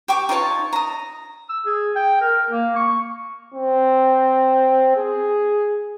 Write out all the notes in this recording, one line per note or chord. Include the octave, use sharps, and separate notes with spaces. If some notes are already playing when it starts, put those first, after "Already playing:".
G4 G5 C#6 D6
D#4 F4 C#5 A5
A#5 D#6
E6
G#4
G5
A#4
A#3
C#6
C4
G#4